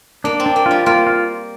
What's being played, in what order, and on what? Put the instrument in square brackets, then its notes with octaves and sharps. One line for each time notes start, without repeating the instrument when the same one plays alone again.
[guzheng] A#3 [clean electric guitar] D4
[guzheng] C4
[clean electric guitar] D4
[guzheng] A#3
[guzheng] G3 [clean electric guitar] F4
[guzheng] A#3 [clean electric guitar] F4
[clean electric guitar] F4